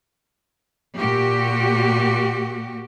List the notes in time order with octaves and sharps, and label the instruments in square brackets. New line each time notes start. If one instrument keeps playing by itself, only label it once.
[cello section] A#2 F#4 G4